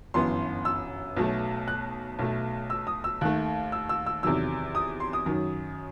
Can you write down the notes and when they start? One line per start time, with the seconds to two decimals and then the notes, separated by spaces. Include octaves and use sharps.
0.14 G1 F#2 E3 B3 C6
0.65 E6
1.17 B1 B2 F#3 A3
1.68 F#6
2.19 B1 B2 A3
2.70 E6
2.87 D#6
3.04 E6
3.21 D#2 D#3 A3 F#6
3.72 E6
3.89 E6
4.06 E6
4.23 E2 C3 D#3 F#3 E6
4.75 D#6
5.00 C6
5.13 D#6
5.26 F#2 D#3 F#3